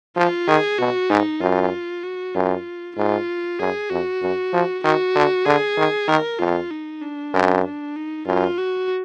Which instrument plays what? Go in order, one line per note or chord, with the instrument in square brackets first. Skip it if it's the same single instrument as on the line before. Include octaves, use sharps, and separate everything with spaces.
[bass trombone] F3 [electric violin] F4
[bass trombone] D#3 [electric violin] G#4
[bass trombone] B2 [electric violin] F#4
[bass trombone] G#2 [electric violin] D#4
[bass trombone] F#2 [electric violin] F4
[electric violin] F#4
[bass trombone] F#2 [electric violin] F4
[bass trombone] G#2 [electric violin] F4
[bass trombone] F#2 [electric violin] G#4
[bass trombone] F2 [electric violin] F#4
[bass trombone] F#2
F3
[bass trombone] D#3 [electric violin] F#4
[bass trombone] D3
[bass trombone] D3 [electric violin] G#4
[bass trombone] D#3
[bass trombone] D#3 [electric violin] A#4
[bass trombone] F2 [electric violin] F4
[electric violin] D#4
D4
[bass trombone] F#2
[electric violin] D4
D#4
[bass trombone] F#2 [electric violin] F4
[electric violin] F#4